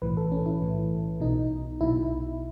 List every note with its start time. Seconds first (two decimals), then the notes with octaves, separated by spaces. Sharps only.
0.02 B1 A2 E3 B4
0.17 A4
0.32 C#4
0.46 E4
0.62 B1 A2 E3
1.20 B1 B2 D#4
1.81 B1 B2 E4